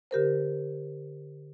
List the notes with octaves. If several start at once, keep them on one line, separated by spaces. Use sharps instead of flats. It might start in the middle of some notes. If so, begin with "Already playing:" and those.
D3 G4 A#4 C5